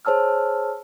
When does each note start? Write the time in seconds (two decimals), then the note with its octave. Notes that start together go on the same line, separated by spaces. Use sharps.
0.05 G#4 C5 C#5 A5 E6 F6